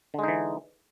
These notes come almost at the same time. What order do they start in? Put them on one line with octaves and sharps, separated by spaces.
D3 G#3 D#4 E3